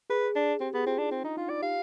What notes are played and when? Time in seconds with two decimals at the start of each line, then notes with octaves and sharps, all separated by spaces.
0.10 G#4 B4
0.36 D4
0.60 C4 G4
0.74 B3 G#4
0.86 C4 F4
0.98 D4 D#4
1.11 C4 F4
1.24 D4 D#4
1.37 D#4 F4
1.50 F4 D5
1.62 G4 F5